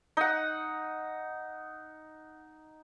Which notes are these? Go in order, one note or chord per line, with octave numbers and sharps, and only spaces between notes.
D#4 F#5